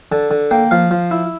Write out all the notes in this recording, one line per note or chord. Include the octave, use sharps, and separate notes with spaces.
D3 A5
D3
A#3 G5
F3 F5
F3
E4